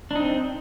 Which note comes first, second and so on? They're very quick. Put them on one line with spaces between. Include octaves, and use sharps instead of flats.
D4 D#4 C4